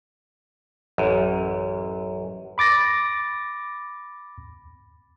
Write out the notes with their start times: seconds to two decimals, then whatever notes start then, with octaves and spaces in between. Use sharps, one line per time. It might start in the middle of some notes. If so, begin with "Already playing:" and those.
0.98 A1 F#2
2.58 B5 D6 A6 A#6